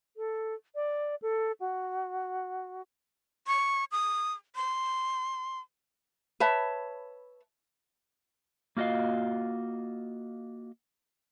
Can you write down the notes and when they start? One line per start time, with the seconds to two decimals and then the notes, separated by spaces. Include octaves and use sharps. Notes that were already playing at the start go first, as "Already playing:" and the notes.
0.17 A4
0.75 D5
1.22 A4
1.60 F#4
3.47 C#6
3.92 D#6
4.56 C6
6.40 B4 C#5 E5 A5
8.77 A#3 F4 F#4 D#5 F5